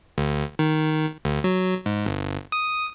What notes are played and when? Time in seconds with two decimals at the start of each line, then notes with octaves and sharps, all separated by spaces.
0.18 D2
0.59 D#3
1.25 D2
1.44 F#3
1.86 G#2
2.06 G1
2.52 D#6